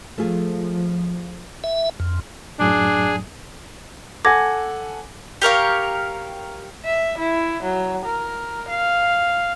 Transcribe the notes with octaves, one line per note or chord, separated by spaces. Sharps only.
F3 A3 F4 G#4
E5
F2
F#2 A2 F#3 D4 G#4
A4 F#5 G#5 D6 G#6 A#6
G4 A#4 C#5 F5
E5
E4
F#3
A#4
F5